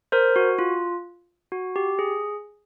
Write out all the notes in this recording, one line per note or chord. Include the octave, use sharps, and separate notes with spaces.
A#4 C5
F#4
F4
F#4
G4
G#4